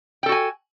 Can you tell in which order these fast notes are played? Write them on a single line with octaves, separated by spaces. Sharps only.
G5 A4 F#4 G#5